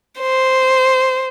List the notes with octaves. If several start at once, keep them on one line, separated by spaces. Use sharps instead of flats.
C5